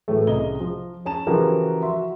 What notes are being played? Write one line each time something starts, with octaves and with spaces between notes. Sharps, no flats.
A2 E3 F#3 A3
C2 C#3 D#5 G7
F3
C#4 A5 E7
C#3 E3 F3 F#4 G4 A#4
F#4 E5 C6